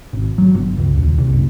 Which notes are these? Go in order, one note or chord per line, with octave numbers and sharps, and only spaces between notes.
G#1
F#3
G1
C#2
D#1
C2
F#1